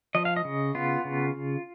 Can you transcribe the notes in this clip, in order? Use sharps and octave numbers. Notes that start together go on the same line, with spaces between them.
F3 D#5
F5
D#5
C#3
B3 F4
C#3